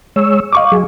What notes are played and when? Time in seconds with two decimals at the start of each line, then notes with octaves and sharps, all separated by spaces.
0.16 G#3 C#5 E6
0.53 D#5 F5 C#6 D6
0.72 F#3 G#4